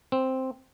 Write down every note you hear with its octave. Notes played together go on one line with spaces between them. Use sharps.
C4